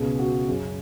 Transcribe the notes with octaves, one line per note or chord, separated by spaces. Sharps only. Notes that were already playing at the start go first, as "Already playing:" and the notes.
Already playing: C#2 B2 G#4
F#4
F#2 C#3 G#4